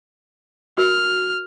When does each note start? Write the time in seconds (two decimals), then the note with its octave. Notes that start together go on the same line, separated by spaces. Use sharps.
0.78 F#4 A#4 F6